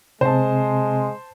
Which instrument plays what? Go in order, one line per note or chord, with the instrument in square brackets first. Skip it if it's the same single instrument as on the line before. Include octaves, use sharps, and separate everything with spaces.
[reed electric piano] C3 C4 [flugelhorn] G#3 [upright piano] C5 A5